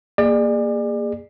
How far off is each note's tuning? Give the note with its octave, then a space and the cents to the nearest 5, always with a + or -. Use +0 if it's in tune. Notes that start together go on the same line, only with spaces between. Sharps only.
A#3 +0 G#4 -20 D5 +30